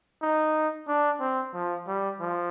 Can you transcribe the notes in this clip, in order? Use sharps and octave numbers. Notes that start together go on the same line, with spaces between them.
D#4
D4
C4
F3
G3
F3